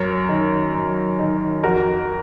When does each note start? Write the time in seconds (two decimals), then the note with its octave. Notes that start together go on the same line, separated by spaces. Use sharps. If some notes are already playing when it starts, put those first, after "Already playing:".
Already playing: F#2 A#4 C#5
0.29 D#3
0.74 F#2
1.19 D#3
1.63 F2 F#4 A#4